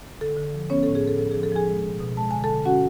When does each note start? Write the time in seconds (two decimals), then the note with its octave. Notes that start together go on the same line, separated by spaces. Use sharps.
0.21 D3 A4
0.37 D3
0.54 F3
0.70 B3 C#4 C#5
0.83 A2 A4
0.95 G#4
1.02 B3
1.07 A4
1.19 F3 A4
1.31 F3 G#4
1.43 A4
1.52 F3 G#4 G#5
1.67 G#3
1.85 B2
2.00 B2
2.17 G#3 A5
2.31 D3 G#5
2.44 A4 A5
2.50 D3
2.65 C#4 F#4 F#5